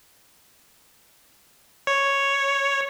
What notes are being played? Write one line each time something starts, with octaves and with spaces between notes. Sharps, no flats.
C#5